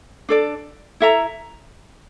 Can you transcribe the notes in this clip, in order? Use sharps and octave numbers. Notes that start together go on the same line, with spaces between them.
D4 A4 D5
E4 A4 E5 A#5